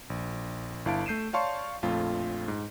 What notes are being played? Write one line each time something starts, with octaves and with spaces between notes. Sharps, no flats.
A#1
G1 E4 F5 A5 D7
A3 G6 C7 D#7 E7
C#5 D5 F5 A5 C6 C#6
A#1 F2 A3 F4
G#2